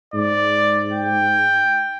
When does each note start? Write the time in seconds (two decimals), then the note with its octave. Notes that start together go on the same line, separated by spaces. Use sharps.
0.14 G#2 D5
0.93 G5